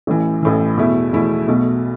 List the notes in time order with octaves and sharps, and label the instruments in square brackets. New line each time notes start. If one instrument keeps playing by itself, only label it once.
[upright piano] A1 A2 E3
A1 A2 E3
E2 B2 A3 E4
E2 B2 A3 E4
B1 B2 A3